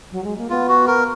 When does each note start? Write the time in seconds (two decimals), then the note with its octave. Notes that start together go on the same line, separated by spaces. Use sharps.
0.12 F#3
0.24 G#3
0.38 A#3
0.50 B3 F4
0.69 F#4
0.87 A#4